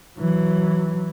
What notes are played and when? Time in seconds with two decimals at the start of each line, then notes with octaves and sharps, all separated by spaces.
0.18 E3 F#3